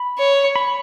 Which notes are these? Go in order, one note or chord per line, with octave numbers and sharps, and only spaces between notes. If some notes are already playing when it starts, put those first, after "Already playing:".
Already playing: B5
C#5
B5